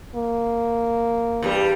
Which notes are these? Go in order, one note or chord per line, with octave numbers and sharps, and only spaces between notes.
A#3
E2 G2 G3